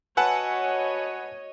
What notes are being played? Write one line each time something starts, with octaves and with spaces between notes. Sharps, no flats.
F#4 B4 C#5 D#5 F#5 G#5 A5 E6